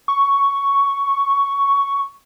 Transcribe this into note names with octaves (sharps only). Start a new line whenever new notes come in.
C#6